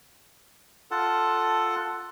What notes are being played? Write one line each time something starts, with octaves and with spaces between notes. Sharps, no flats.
F4 A4 F#5 A5